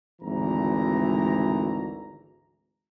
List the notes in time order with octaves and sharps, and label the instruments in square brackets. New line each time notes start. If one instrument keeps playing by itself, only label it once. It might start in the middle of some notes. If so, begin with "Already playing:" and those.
[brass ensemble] G#1 D2 E3 A#5